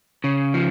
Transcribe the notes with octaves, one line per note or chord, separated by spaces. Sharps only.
C#3
F3